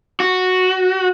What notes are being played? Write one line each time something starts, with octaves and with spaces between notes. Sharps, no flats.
F#4